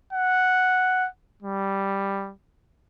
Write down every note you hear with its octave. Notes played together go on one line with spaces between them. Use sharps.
F#5
G3